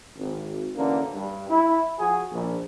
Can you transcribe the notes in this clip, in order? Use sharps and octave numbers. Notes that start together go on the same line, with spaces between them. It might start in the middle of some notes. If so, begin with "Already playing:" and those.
G#1
F#2 D3 E3 A#3 C#4
G2
E4
F3 F#4 G#4
A#1